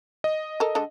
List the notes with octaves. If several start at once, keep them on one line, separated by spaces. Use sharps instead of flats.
D#5
A4 A#4
D3 G#3 A4